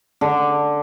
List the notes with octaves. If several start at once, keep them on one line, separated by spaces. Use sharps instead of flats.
D3